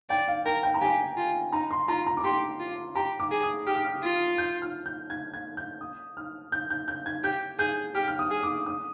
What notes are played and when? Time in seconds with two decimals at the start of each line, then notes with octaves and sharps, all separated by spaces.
0.10 D5 G5
0.28 F5
0.46 A#4 G5
0.63 G5
0.74 A#5
0.81 G4 G#5
1.17 F4
1.52 D#4 A#5
1.71 C6
1.88 F4 A#5
2.07 A#5
2.17 D6
2.24 G4 C6
2.60 F4
2.95 G4 A#5
3.20 D6
3.31 G#4
3.43 D#6
3.67 G4 F6
3.75 D#6
3.84 F6
4.03 F4
4.38 G6
4.62 F6
4.86 G6
5.10 G#6
5.34 G#6
5.57 G6
5.81 D#6
6.17 F6
6.52 G6
6.70 G6
6.88 G6
7.06 G#6
7.24 G4 G6
7.59 G#4 G6
7.95 G4 F6
8.08 F6
8.19 D#6
8.31 G#4
8.43 D6
8.66 D#6